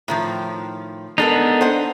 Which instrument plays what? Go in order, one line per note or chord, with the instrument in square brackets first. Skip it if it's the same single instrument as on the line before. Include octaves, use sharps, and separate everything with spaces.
[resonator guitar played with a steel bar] A2 D#3 F3
[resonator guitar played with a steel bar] G#3 A4 A#4 [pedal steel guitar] B3 D4 D#4
[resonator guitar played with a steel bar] C5 F#5